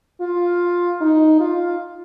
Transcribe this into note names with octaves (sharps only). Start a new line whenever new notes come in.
F4
D#4
F4